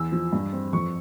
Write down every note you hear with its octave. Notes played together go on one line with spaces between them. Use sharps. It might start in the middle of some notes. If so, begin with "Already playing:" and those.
Already playing: E2 E6
F3
G2
C4
F2 C#6